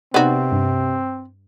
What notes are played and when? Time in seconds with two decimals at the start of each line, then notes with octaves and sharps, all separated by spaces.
0.14 C3 B3 C4 D#4 F#4 D5
0.52 G2